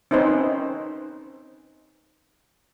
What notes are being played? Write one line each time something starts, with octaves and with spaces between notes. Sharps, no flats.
C4 C#4 D#4 B4 C5